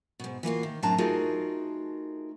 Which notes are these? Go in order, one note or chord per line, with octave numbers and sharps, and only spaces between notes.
G#2 B2
E3 A#3 F4 F#4
D#3
F#2 A2 C4 D4 A5 A#5
A3 D#4 F4 F#4 G#4 A#4